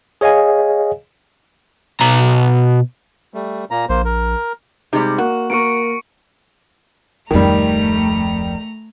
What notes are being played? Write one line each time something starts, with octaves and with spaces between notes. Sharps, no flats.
G#4 C#5 D#5 F5 G#5
B2 A#5
G3 A3
A#2 A#3 A#5
A#1 A#3 C5
A#4
C3 G3 G#3 D#4
A#3 F#4
A#3 A#4 C#6 C#7 D7
D1 F2 D#3 G3 A3 A#5